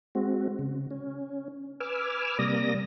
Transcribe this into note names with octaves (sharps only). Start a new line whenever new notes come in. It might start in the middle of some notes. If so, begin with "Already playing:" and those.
G#3 C4 F#4
C#3
C#4
B4 G#5 D6 E6 F6
C3 G3 A#3 D5 D#6 A#6